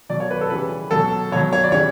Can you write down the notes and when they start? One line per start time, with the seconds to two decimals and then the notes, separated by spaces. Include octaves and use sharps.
0.09 B2 F#3 D5
0.20 C#5
0.31 B4
0.41 A4
0.50 C#3 E3 G3 B4
0.91 B2 F#3 A4
1.31 B2 C#5
1.36 F#3
1.53 C#5
1.64 D5
1.72 C#3 E3 G3 C#5